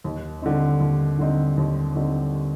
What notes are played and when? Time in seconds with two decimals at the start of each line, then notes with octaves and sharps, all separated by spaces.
0.04 D#2
0.42 D3 G3 C4 D#4
0.80 D#2
1.19 D3 G3 C4 D#4
1.57 D#2
1.95 D3 G3 C4 D#4